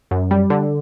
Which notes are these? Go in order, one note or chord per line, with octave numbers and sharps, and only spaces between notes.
F#2
G3
D3